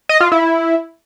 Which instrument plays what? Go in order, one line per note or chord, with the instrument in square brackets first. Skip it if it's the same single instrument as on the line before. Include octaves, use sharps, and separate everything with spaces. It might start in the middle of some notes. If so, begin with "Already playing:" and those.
[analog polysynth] D#5
F4
E4